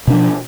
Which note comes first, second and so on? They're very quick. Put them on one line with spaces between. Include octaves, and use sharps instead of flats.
B2 D4 F3